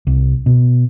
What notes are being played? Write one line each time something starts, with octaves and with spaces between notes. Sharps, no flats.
C2
B2